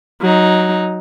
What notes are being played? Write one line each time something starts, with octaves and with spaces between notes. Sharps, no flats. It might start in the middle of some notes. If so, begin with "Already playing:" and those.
F#3 D#4